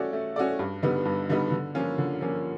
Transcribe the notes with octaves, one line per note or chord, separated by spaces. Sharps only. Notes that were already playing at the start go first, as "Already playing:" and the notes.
Already playing: A3 C#4 F#4 A4 D5
A3
C#4 F#4 A4 D5
G2
D3 G3 B3 D#4
G2
D3 G3 B3 D#4
D3
F3 A#3 C#4 F4
D3
F3 A#3 C#4 F4